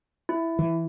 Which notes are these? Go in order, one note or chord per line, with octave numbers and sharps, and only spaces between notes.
E4
E3